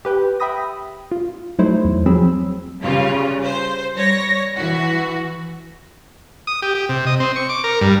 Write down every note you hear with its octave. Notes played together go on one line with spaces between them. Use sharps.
G4 B4 G5
E5 G5 B5 D#6 A#6
F4
F#3 A3 D#4 E4 C5
E2
F3 F#3 C4 G#4 B5 E6
C#3 G3 F4
C5
G3 C#5 A#6
E3 F#4
D#6
G4
G4
C3
D#5
C4
C#6
D6
A#4
G2